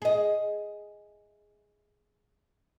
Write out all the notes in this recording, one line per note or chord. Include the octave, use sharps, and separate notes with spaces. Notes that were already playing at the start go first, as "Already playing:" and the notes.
G#4 D#5